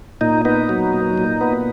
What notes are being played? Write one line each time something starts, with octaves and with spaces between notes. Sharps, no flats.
A#2 D#4
B3 D#4
F#3
A#2
A#2
B3